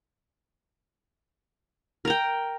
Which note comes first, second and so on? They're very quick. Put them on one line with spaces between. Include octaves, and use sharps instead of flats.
A#4 A#5 G5